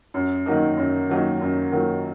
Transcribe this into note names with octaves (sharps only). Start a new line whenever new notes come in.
F#2
D#3 F#3 A#3 D#4
F#2
D#3 F#3 A#3 D#4
F#2
D#3 F#3 A#3 D#4